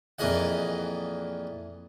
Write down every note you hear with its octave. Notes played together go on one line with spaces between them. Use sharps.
F2 A#2 E3 G#4 D#5 F#5